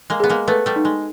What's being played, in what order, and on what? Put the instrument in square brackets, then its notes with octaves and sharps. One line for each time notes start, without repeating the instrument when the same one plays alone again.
[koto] G#3 A#3
[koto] B3 [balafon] G#4
[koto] G#3 A#3
[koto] A3 B3 [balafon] B4
[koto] G3 A3
[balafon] D#4
[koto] G#3